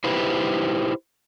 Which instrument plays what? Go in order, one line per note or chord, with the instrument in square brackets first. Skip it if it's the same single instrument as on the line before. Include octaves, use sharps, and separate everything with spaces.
[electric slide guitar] D#4 E4 G4 B4 C5